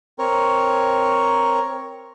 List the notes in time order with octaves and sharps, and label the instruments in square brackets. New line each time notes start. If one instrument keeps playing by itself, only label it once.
[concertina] C4 A#4 C#5